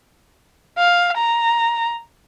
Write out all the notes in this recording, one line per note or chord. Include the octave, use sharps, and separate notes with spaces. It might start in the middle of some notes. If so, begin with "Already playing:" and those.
F5
A#5